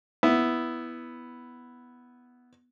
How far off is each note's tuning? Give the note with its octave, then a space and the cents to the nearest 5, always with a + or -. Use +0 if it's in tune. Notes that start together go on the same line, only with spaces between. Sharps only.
B3 +0 E4 +0